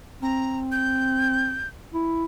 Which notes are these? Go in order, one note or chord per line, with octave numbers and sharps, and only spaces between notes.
C4 A#5
G6
E4